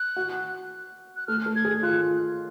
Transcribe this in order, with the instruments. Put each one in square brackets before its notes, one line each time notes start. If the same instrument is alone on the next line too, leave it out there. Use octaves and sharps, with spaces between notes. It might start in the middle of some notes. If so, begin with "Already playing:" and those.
Already playing: [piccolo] F#6
[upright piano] F#4
[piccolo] F#6
[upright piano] A3 [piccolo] F6
[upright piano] A3
[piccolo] G#6
[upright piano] G#4
[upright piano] F4 [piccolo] F#6